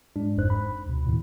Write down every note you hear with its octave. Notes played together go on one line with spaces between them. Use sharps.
G#2 G#3 D4
G1 F2 G#2 D#4 C5 F#6
B5
D2 B2
E2 A2 D#3